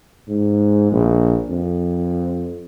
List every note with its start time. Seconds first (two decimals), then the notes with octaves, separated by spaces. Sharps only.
0.28 G#2
0.92 A#1
1.49 F2